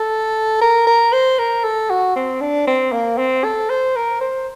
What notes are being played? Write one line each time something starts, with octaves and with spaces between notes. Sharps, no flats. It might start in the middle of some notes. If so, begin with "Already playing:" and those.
Already playing: A4
A#4
A#4
C5
A#4
A4
F#4
C4
D4
C4
A#3
C4
A4
C5
A#4
C5